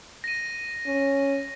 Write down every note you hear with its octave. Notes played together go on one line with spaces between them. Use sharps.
A#6 D#7
C#4